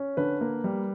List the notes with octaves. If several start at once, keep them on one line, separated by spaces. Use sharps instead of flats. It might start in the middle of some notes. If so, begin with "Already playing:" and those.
Already playing: C#4
D3 B4
A#3
G3